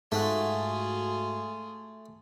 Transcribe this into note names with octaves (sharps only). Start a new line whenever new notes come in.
G#2 A3 F4 F#4 G#4